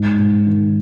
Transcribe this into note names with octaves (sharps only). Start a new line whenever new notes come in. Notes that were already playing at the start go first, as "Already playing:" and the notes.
Already playing: G#2
G#2
D#3